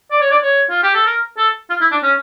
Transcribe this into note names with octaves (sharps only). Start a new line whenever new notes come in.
D5
C#5
D5
C#5
F4
G4
A4
A#4
A4
F4
E4
D4
C#4